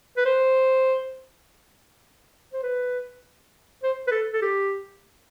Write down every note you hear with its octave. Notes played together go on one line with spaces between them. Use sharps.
B4
C5
C5
B4
C5
B4
A4
A4
G4